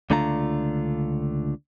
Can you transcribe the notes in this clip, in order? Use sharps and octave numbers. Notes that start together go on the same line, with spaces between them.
C#2 D3 A3 D4 F4 A#5